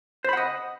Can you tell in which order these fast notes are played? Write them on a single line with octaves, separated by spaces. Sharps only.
C5 B5 F#5 D#5